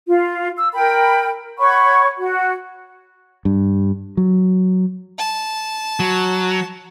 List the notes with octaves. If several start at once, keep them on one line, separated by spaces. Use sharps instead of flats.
F4
E6
A#4 G5 B5
C#5 F#5 B5 C#6
F#4
G2
F#3
A5
F#3